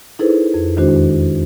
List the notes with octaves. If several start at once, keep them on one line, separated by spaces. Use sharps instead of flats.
D#4 E4 G#4 A4 B4 C5
F2
E2 D#3 G#3 D4 F#4 C5